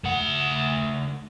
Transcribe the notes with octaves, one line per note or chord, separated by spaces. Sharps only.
A3 F#5